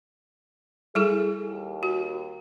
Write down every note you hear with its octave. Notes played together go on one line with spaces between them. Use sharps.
G3 E4 G#4 A4
D#2
F#4